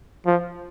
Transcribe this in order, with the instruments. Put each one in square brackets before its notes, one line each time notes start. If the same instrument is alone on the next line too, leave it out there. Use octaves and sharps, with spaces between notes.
[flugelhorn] F3